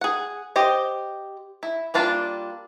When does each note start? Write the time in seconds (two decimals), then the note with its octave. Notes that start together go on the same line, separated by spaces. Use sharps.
0.01 G#4 F#5
0.56 G4 C5 D#5
1.63 E4
1.94 G3 A#3 D4 F4